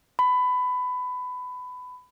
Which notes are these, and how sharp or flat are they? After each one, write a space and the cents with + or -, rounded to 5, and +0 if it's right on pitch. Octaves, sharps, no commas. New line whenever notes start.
B5 +20